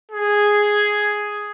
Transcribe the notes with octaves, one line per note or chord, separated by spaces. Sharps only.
G#4